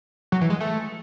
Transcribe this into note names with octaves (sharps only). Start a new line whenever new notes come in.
F#3
E3
G#3
A3